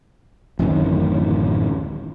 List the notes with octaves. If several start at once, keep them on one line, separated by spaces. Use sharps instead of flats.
D1 A1 F#2 D#3